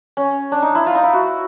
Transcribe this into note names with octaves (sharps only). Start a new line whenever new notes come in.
C#4
D4
D#4
E4
F4
D#4
E4
F#4